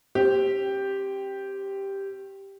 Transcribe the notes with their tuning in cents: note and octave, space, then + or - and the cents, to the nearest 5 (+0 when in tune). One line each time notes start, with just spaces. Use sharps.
C#4 -45 G4 +0 C5 +0